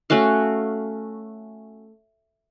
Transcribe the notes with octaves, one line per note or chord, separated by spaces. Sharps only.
A3 C#4 F#4 F5